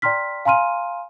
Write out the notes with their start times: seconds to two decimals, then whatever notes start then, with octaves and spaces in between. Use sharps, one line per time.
0.02 D5 G5 A#5 C6 F6 B6
0.45 F5 G#5 A#5 C6 F6 D#7